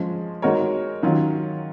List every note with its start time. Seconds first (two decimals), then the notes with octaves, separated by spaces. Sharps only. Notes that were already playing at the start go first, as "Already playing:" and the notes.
Already playing: F3 G#3 C#4
0.42 G#3 D#4 F#4 A#4 C#5
1.03 D#3 F#3 C#4 F4